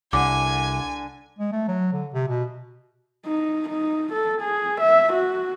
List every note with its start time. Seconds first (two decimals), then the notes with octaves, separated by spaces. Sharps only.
0.13 C2 D3 G#5 D6
1.39 G#3
1.52 A3
1.68 F#3
1.93 D3
2.14 C3
2.28 B2
3.26 D#4
3.69 D#4
4.13 A4
4.41 G#4
4.81 E5
5.13 F#4